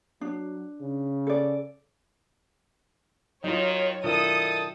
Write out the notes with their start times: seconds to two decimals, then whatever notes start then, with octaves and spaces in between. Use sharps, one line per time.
0.21 F#3 D4
0.81 C#3
1.27 A4 D5
3.44 D#3 F#3 D#4 F4 F#4 C#5
4.04 B2 D#3 D4 E4 F4 A4 D#6